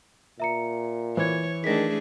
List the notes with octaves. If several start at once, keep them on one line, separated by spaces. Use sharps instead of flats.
A#2 E5 A#5 C#7
E3 C5 C#5 G#6
D#3 A3 D4 G#4 A#6 B6